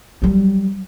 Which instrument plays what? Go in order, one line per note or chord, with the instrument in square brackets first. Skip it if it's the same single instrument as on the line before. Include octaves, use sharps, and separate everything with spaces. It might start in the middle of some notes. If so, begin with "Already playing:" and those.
[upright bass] F#3 G3